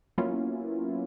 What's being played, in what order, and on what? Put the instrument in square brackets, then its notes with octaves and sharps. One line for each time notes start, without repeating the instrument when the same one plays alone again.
[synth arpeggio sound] F#3 A#3 B3 C#4 E4 F4